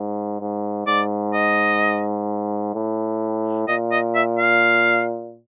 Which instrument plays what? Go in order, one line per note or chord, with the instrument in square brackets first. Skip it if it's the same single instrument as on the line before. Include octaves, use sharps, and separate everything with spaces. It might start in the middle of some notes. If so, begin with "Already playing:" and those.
Already playing: [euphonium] G#2
G#2
[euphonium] G#2 [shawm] D5
[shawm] D#5
[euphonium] A2
[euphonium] A#2 [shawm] D#5
[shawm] D#5
E5
F5